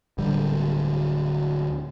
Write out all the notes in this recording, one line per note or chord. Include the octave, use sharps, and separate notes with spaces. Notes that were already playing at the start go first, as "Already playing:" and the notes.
D1 D3 G3